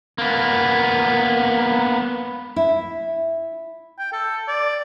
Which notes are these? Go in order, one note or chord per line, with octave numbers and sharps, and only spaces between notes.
A#3 B3
E4
G5
A4
D5